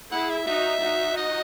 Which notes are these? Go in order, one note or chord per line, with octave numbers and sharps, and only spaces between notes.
E4 G#4 F#5
E5
D#4 F#4 E5
D#4 F#4
D#5